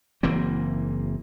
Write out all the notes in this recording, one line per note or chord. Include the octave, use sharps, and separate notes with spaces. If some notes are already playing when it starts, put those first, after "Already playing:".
F#1 E3 A#3 C4